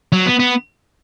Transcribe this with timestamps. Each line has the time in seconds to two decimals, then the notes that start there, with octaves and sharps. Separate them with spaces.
0.12 F#3
0.26 B3
0.39 B3